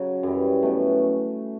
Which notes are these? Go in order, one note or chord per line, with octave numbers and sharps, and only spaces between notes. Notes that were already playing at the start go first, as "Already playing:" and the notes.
Already playing: C#3 F#3
F#2 E3 G3
B2 A3